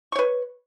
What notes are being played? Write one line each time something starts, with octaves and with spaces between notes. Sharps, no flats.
B4 C#5 C#6